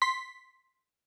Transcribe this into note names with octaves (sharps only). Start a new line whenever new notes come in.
C6 B6